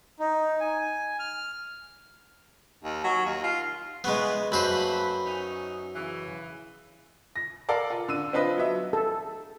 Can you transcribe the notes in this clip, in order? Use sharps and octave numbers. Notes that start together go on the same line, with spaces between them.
D#4
G#5
F6
D#2
F#3
D#2
F4
C#3 E3 G#3 B3 B4
F#2 A3 A#3 B4 C5 B5
C#4 D#4
C#3 E3
A#6
A4 A#4 D5 F5
F4
D3 E6 D#7
C4 D4 F4 B4 D#5
F#3 B3 E5
A4